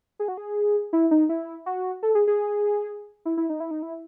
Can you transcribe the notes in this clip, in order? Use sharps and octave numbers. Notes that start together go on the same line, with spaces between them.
G#4
F#4
G#4
E4
D#4
E4
F#4
A4
G#4
G#4
E4
E4
D#4
E4
D#4
E4